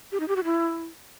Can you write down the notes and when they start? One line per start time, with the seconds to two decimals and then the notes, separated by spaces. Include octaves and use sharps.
0.12 G4
0.20 D#4
0.28 G4
0.36 F#4
0.44 E4